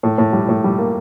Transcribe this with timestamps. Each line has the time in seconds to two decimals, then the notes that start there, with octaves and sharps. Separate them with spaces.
0.03 A2
0.18 A2
0.33 G3
0.49 A2
0.64 G3
0.78 A#3